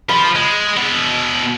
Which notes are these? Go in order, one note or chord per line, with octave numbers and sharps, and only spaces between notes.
F3 B5
G#3
B2 E4